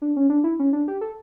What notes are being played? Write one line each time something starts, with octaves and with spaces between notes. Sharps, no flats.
D4
C#4
D4
E4
C#4
D4
G4
A4